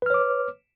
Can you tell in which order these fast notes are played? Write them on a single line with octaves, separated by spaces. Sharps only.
B4 F6 C#5 D6